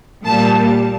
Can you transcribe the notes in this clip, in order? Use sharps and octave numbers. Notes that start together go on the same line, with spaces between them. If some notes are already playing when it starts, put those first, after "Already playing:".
A#2 G3 A5